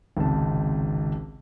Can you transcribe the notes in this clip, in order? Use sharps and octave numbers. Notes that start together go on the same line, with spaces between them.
G#1 C#2 C3 A5